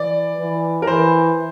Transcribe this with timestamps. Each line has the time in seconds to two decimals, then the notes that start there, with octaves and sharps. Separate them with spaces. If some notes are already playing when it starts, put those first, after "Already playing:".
Already playing: E3 D5
0.39 E3
0.82 A#4
0.87 E3 C5